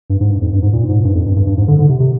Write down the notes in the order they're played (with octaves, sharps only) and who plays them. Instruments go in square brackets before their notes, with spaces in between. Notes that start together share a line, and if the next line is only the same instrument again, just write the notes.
[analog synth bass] G2
G#2
G2
F2
G2
G#2
A#2
G#2
G2
F2
G2
G2
G2
G#2
D3
D3
C3
C3